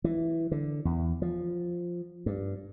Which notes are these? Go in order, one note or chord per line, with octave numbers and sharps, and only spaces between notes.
E3
D3
E2
F3
G2